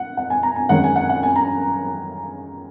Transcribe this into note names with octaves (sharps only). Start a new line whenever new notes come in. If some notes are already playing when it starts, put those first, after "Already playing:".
Already playing: F#5
F#5
G#5
A#5
G#5
F#2 D#3 G#3 C#4 F#5
G#5
F#5
F#5
G#5
A#5